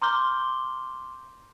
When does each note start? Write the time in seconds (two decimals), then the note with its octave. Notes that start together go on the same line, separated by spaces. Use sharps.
0.02 A#5 C6 D6 F6 G6 G7